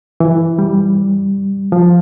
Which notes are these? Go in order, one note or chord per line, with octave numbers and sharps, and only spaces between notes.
E3
G3
F3